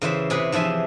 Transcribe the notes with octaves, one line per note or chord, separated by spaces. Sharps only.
C#3 E3 C5 E5
C3 G#4 B4
E3 F3 C5 E5 G#5